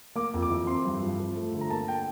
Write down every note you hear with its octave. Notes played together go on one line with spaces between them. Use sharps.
A#3 D6
F2
D6
E3
C4 C6
G2
F3
F3
A3
D3
A#5
A#3 A5
G5